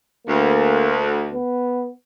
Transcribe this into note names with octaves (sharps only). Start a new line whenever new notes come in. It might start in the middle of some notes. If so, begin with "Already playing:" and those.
D2 A#3
B3